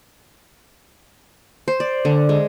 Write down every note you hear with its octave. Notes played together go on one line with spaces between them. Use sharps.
C5
D5
D3
G#3